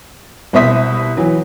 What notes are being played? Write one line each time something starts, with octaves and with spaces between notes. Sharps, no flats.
C2 B2 C5 E5 D#6 B6
E3 F#3